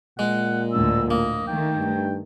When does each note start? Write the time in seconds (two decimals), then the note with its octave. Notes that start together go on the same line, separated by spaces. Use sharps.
0.19 A#2 G#3 F#5
0.73 D2 A2 D3 E6
1.10 A2 A#3 D#5
1.47 D#3 A3 G5
1.77 G2